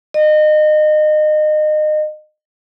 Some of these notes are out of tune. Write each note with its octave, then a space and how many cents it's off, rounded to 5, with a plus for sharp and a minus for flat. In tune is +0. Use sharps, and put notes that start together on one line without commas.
D#5 -30